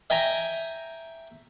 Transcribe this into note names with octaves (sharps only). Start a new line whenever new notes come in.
E5 G5 G#5 A#5